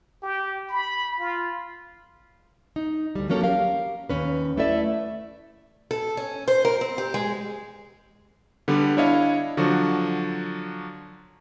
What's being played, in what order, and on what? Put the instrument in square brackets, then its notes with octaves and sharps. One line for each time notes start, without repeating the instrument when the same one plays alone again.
[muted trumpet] G4
B5
F4
[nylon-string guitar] D#4
D2 G3
F3 F#3 A#3 C#4 G4 A4
G4 A#4 F5
D#2 C#4 B4
A3 E4 A4 B4 D5 E5
[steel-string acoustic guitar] A4
C#4
C5
A#4
C4
G4
G#3
[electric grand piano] D3 G3 B3
D4 E4 C#5 D#5 F5
D3 F3 F#3 F#4